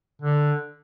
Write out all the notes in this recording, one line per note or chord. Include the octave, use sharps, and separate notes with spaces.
D3